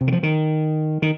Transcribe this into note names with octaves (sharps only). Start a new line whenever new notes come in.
C3
D#3
F3
D#3
D#3